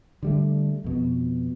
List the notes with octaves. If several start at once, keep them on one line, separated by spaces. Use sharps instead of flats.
D3 G3 A3
F2 B2